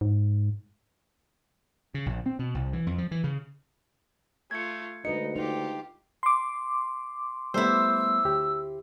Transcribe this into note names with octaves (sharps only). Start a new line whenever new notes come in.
G#2
C#3
A#1
C4
B2
C2
E3
F2
F3
E3
C#3
A3 F4 G#6 C#7
D2 G#3 D#4 B4 D#5 C#7
D#4 F4 G4
C6 D6
G3 A3 B3 E4 C5 E6
D2 G4